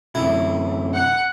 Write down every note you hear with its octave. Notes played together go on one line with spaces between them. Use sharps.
F#2 C3 E4
F#5